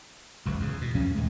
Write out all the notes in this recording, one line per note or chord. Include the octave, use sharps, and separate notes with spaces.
D1 C#2 F#2
E2 C#3
B2
E2 F3 C#4
D#2 A#2 G#3